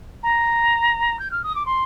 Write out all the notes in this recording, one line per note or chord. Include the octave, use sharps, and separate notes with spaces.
A#5
G6
F6
D#6
D6
C6